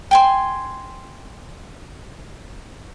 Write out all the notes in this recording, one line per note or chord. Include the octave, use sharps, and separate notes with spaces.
G5 G#5 C6